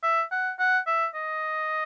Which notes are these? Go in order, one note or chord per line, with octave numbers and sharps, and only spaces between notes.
E5
F#5
F#5
E5
D#5